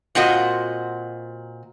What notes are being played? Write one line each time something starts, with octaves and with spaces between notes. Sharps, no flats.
A#2 C4 F#4 D#5